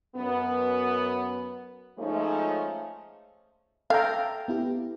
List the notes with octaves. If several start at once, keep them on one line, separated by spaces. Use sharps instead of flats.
F#2 B3
F3 G#3 A3 C#4 D#4
A4 E5 F5 G5 A#5
B3 E4 G4